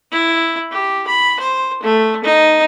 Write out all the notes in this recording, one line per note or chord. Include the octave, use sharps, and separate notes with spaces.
E4
G4
B5
C5
A3
D#4